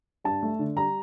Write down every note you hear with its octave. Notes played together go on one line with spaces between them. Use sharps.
G2 A5
A3
D3
G3 A#5